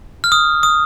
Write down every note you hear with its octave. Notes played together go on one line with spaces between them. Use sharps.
F6
D#6
D#6